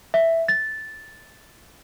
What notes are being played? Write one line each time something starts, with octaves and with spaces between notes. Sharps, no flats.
E5
A6